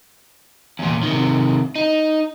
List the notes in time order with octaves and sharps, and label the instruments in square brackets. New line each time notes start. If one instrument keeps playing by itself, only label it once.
[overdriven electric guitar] E2 A#2
C3 D#3
D#4